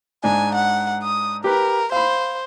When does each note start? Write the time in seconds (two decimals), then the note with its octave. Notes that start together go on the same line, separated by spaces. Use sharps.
0.24 G#2 D4 G#5
0.55 F#5
1.03 D#6
1.44 G4 A#4 B4
1.92 C5 F5 B5